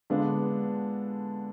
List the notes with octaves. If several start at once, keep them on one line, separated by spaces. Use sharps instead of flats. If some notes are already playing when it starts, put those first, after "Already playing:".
D3 G#3 B3 D4 F4